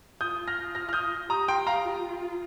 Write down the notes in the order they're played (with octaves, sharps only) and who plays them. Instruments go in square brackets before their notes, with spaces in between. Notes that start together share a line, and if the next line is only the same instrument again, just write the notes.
[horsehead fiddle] F4 [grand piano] D#6 G6
[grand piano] F6 A#6
F6 A#6
F6
D#6 G6
[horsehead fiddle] G4 [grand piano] A#5 D#6
[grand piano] G5 C6
F5 A#5
[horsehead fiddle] F4